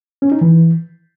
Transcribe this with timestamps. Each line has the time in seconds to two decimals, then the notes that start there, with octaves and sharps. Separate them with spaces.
0.22 C#4
0.32 D#4
0.41 E3